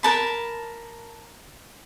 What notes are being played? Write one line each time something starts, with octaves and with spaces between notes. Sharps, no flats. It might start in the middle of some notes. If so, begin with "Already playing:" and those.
A#4 A5 B5